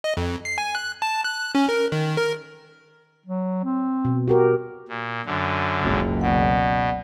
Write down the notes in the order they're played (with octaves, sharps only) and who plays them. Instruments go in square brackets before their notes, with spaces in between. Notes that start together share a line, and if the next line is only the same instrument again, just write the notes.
[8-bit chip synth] D#5
F2
C7
G#5
F#6
A5
F#6
C#4
A#4
D#3
A#4
[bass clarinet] F#3
C4
[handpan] B2
F#4 G4 A#4
[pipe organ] A#2
F#2 D3
[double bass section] F#1 C#2
[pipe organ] B2 [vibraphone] D5 F#5